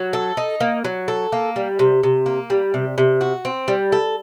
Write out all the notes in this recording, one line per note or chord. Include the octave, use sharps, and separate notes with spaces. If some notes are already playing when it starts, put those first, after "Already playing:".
Already playing: F#3
A4
D#4
A#3
F#3
A4
A#3
G3
C3
C3
A#3
G3
C3
C3
F#4
C4
G3
A4